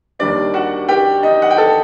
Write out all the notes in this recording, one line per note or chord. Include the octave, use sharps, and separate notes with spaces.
D#2 D#3 G3 D4 D5
F#4 F#5
G4 G5
D#4 D#5
F#5
G5
A4 A5